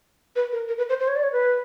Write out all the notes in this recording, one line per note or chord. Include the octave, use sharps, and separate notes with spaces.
B4
A#4
A#4
B4
C5
C5
C#5
D5
C#5
B4